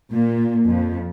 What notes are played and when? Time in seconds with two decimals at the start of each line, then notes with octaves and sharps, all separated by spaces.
0.13 A#2
0.67 F2